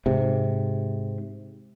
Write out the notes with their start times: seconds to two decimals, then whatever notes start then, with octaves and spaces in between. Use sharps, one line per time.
0.06 G#2 C3